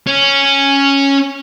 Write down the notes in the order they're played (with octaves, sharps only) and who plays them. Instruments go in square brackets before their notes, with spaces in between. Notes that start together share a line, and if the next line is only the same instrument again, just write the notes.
[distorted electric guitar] C#4